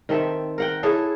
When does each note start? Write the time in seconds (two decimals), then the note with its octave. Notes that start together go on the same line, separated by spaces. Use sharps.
0.09 D#3 C4 A4 E5
0.58 A#4 F#5 G5
0.83 E4 G#4 A4 C#5